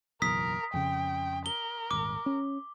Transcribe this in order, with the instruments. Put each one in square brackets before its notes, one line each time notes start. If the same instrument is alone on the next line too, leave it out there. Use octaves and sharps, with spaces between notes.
[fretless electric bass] F#1 B1 E2 [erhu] A#4 [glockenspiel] D#6 B6
[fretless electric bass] F2 C#3 [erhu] G5
[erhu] A#4 [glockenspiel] G7
[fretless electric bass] D#1 G#1 [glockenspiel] D6
[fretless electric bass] C#4